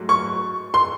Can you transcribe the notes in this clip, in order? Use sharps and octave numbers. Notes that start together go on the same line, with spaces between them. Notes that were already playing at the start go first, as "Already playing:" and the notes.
Already playing: G#2 F#3 A3
C#6
C6